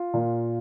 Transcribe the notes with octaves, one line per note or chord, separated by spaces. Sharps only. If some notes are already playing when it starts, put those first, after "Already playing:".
Already playing: F4
A#2